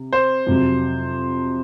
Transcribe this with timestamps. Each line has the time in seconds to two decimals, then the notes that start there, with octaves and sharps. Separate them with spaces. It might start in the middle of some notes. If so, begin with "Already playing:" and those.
Already playing: C3
0.13 C5
0.47 F2 C3 F#3